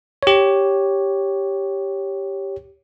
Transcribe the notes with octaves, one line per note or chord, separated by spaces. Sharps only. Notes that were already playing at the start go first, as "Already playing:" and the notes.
G4 C#5